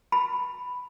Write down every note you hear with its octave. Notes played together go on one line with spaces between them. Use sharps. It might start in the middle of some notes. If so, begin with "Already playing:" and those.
B5